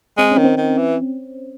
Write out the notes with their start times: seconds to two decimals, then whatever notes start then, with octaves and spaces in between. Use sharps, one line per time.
0.18 G#3 C4
0.31 C#4
0.38 D#3
0.44 C4
0.58 D#3
0.78 E3